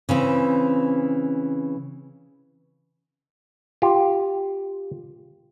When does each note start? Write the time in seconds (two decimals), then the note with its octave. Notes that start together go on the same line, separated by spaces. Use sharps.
0.09 C#3 E3 C4
3.82 F4 G4